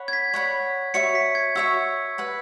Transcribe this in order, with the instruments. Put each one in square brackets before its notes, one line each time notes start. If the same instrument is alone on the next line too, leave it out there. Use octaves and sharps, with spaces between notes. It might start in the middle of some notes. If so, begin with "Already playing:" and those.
Already playing: [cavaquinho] C#5 F#5 B5
[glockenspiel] G#6
B6
[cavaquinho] C#5 F#5 B5
[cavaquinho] F#4 C#5 E5 C#6 [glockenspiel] C#7
[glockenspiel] B6
G#6
[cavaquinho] F#4 C#5 E5 C#6 [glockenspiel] E6
[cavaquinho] B4 F#5 B5